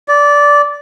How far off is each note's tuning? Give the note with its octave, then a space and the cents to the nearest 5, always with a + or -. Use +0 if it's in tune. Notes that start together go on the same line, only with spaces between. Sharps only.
D5 -15